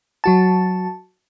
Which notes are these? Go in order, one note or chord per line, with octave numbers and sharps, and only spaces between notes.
F#3 F#4 A5